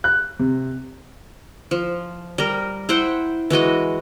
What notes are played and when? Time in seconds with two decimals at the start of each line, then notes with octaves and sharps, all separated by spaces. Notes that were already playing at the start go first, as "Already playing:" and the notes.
0.04 F#6
0.39 C3
1.71 F3
2.38 G3 A#4
2.89 E4 C5 F#5 G5
3.50 E3 G#3 F#4 D#5